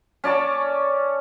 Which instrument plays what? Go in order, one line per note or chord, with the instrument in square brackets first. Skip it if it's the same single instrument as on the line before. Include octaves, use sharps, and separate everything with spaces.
[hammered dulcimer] C#4 D5 A5 C#6